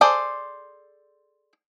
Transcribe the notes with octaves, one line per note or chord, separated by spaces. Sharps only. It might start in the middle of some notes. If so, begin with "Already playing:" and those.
G#4 A4 C5 D5